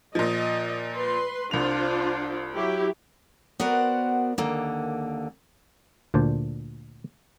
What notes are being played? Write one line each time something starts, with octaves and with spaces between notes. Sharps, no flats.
A#2 F3 D#5
B4 C6
C2 D4 F4 C5 F7
F#3 E4 G4
B3 F#4 A#4 C5 D5 F#5
D#2 D3 A#3
D2 A#2 D4 C5 D5